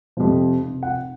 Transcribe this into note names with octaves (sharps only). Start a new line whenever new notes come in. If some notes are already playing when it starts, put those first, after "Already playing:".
F2 C3 F3
F1
F#5